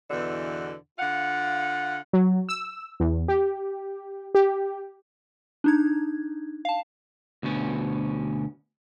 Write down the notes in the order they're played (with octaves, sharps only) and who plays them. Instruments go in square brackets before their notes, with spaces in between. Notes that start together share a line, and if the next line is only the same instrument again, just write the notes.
[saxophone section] E2 B2 D3 E3
D3 F4 F5 F#5
[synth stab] F#3
E6
E2
G4
G4
[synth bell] D4 D#4 G#6
F5 A5
[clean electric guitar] D2 B2 C#4